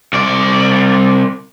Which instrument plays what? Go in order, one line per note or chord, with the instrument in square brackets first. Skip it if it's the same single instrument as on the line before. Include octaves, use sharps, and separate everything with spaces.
[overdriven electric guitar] C2 D5